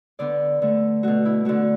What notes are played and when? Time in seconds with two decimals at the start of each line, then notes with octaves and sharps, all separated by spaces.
0.19 D3 B3 D5
0.62 D3 A3
1.03 B2 A3 F#4
1.25 E4
1.45 D3 A3 F#4